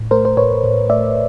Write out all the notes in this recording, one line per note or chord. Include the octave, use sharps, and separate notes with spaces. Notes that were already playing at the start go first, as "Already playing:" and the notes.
Already playing: A2
A3 A#4 C5
C5
A2 B4 C#5
A2
A3 D5 E5